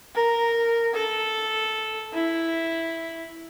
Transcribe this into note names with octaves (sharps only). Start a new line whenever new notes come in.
A#4
A4
E4